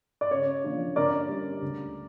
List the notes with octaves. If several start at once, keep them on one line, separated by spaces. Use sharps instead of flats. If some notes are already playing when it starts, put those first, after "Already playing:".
D5
C#3 C#5
F3 A#3 D4
D3 A#4 D5
G3 C#4
D2